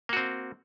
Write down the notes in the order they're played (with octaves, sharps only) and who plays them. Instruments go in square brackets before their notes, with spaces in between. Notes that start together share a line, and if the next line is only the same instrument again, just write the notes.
[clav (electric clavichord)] A#3
F#4
C4